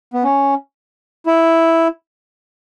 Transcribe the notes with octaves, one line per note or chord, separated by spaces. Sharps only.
B3
C#4
E4